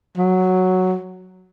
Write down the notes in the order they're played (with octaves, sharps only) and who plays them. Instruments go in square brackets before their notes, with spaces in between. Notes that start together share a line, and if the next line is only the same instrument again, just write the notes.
[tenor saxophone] F#3